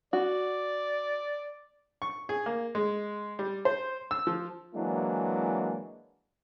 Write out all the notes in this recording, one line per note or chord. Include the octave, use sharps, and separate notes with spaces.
F#4 D5
C#6
G#4
A#3
G#3
G3
C5
E6
F3
E3 F#3 G#3 A#3 D4 E4